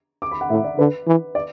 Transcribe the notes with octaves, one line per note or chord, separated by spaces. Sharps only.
D6
B5
F#5
A2 E5
D5
D3 B4
E3
D5